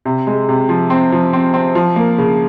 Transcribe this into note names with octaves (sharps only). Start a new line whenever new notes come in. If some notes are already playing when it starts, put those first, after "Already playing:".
C3
G#3
C3
F3
C4
F3
C4
C4
F3
A#3
C#3